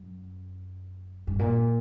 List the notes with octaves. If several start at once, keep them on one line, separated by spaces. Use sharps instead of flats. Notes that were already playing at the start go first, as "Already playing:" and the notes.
Already playing: F#2
G2
A#2